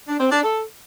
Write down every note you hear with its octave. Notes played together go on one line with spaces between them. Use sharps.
D4
C4
D4
A4